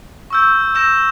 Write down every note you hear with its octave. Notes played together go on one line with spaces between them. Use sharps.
C#6 E6 G6
E6 G6 A#6 E7